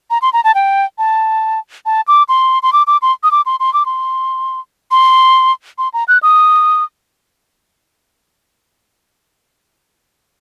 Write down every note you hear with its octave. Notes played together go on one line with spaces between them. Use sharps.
A#5
C6
A#5
A5
G5
A5
A5
D6
C6
C6
D6
D6
C6
D#6
D6
C6
C6
D6
C6
C6
C6
A#5
F#6
D#6